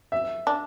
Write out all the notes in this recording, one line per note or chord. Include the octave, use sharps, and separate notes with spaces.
E5
D4